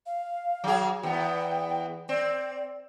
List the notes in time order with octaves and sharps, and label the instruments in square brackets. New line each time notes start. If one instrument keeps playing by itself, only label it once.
[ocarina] F5
[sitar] F#3 G#4
[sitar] E2 B3 [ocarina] G5
[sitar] C4 [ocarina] D5